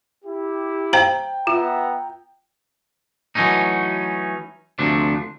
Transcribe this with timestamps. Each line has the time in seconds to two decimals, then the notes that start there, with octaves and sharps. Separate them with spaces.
0.25 E4 G4
0.93 C5 F5 G5 A#5
1.47 B3 F4 E5 A#5
3.35 E3 F#3 A3 C#4 D#4
4.79 D2 C3 F3 A3 D4